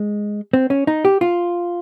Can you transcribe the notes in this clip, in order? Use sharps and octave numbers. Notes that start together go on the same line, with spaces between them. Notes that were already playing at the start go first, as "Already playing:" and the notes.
Already playing: G#3
C4
C#4
D#4
G4
F4